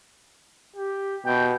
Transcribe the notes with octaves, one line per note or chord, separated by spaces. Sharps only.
G4
B2 G5